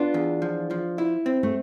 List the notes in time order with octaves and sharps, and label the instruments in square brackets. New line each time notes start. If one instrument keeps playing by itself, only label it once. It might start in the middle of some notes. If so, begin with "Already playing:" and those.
Already playing: [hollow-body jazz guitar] B3 [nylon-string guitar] D4 F4
[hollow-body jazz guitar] E2
F3
F3
E4
C4
[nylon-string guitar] A3